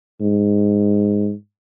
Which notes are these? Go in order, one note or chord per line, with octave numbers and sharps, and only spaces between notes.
G#2